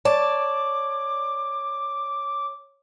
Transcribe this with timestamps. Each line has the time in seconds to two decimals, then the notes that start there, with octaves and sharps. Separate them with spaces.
0.05 C#5 D5 A5 D6